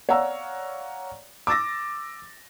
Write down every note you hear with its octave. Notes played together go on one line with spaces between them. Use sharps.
C#5 D5 F5 F#5 A#5 E6
D6 E6 A6 A#6